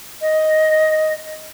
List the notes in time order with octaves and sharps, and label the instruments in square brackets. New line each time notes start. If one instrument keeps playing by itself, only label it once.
[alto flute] D#5